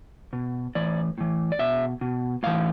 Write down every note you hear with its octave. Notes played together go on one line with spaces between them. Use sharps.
B2
A2 E3 D5
A2 E3
D5
B2 E5
B2
A2 E3 F5